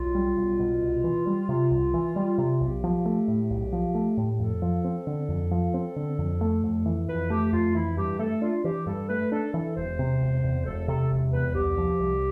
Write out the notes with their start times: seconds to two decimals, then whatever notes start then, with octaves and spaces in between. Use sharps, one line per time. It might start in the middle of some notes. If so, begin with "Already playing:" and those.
Already playing: B1 F4
0.15 G3
0.37 B1
0.60 B2
0.82 C2
1.04 E3
1.27 G3
1.49 C3
1.71 C2
1.94 E3
2.16 G3
2.38 C3
2.61 B1 G4
2.84 F3
3.06 A3
3.28 A2
3.50 B1
3.73 F3
3.95 A3
4.17 A2
4.39 F2 A4
4.62 F3
4.84 C4
5.07 D3
5.29 F2
5.51 F3
5.74 C4
5.96 D3
6.19 F2
6.41 A3
6.63 F2
6.86 E3
7.08 F2 B4
7.30 A3 G4
7.52 F2 F4
7.75 E3 E4
7.97 G2 G4
8.19 A3 A4
8.42 D4 F4
8.64 E3 G4
8.87 G2 A4
9.09 A3 B4
9.32 D4 A4
9.53 E3 A4
9.76 E1 C5
9.99 C3
10.21 E1
10.43 E2
10.66 E1 A4
10.88 C3 A4
11.11 E1
11.32 E2 B4
11.55 C2 G4
11.78 F3
12.00 C2